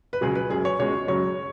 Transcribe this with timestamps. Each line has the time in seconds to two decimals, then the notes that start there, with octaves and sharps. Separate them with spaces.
0.13 B4
0.21 C#2 C#3 F#3 G#4
0.35 B4
0.50 F#2 F#3 G#4
0.65 C#5
0.79 C#2 B2 G#3 C#5
1.07 F#2 C#3 F#3 C#5